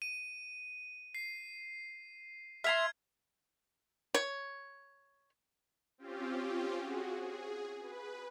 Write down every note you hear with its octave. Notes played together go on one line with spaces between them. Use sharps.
D#7
C7
E5 A#5 C6 F6 G#6
C#5
C4 C#4 F4 G4
F#4 G#4
G#4
B4